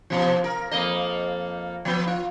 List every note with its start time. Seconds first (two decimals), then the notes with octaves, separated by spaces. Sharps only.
0.10 B2 F3
0.44 A#4
0.71 F2 A#3 D#5
1.85 F3 B3
2.07 F4